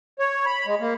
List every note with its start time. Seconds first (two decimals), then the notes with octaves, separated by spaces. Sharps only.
0.19 C#5
0.46 B5
0.66 G#3
0.80 A#3